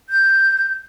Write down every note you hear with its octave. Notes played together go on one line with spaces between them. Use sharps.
G6